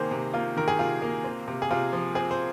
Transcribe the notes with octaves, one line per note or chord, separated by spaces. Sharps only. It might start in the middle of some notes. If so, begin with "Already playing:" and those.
Already playing: C3 D#3 A#3 G#4 C5
C3
A#3 F4
D#3 A#4
G#4
C3 F4
A#3
C4
C3
G#4
C3 F4
F3
C4 G#4
C5